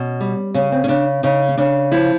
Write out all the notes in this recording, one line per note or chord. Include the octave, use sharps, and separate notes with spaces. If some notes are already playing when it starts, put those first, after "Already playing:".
Already playing: B2 C#4
G3
C#3 C#4
C4
C#4
C#3 D4
C#3 D#4
C#4
C#3 D4
F3 E4